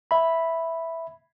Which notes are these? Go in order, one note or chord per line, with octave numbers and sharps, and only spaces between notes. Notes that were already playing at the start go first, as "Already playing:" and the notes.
E5 B5